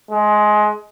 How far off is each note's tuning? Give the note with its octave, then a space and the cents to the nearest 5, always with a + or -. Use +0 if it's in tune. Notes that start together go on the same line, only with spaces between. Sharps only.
G#3 +20